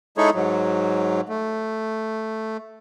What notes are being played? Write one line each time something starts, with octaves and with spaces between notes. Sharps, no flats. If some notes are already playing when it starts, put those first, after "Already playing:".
G#3 D#4 E4 G#4 A4 C#5
G#2 F#3
A3